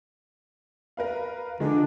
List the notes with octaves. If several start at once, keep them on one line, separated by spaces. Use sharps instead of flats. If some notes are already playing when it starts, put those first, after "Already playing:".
A#4 B4 F5
D3 F3 G#3 D4 D#4